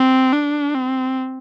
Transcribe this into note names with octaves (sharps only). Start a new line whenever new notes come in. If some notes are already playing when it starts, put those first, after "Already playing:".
Already playing: C4
D4
C4